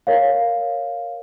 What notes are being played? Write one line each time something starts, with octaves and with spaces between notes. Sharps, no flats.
A#4 C#5 F5